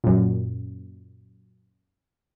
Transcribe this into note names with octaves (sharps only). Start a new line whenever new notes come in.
F#2 A#2